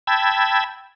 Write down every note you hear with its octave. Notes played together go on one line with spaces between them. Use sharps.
G5 A5 B5 E6 G#6